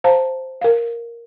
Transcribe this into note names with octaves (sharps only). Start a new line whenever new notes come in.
C5 F5 A5 A#5
A#4 F5